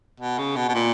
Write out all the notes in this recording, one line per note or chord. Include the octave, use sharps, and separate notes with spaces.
B2
C#3
B2
B2
A#2